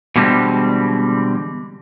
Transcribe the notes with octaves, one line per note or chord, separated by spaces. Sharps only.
B2 D3 E3 G3 G#3 C4